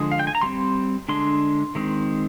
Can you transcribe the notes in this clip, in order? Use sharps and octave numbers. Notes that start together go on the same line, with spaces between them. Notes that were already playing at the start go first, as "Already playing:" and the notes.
Already playing: D3 F3 G#3 D#6
F5
G5
G#5
A#5
G3 C4 C6
D3 G#3 D4 C6
D#3 G#3 C4